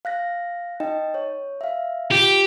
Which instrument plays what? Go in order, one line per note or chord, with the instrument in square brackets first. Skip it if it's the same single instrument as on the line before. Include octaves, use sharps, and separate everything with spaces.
[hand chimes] F5 F#6 A#6
D#4 D#5 G5
C#5
E5 F5
[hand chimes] F4 [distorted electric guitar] G4